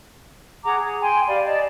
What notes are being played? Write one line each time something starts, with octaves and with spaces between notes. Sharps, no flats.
G#4 F#5 A#5 D6
G#4
G5 G#5 C6
G4 D5 F5 B5
D5 D#5 A5